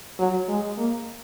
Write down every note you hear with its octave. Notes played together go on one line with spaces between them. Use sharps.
F#3
G#3
A#3